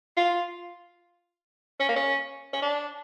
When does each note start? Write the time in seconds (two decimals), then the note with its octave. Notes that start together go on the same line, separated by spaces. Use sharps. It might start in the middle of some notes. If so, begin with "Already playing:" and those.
0.17 F4
1.80 C#4
1.89 A#3
1.96 C#4
2.53 C#4
2.62 D4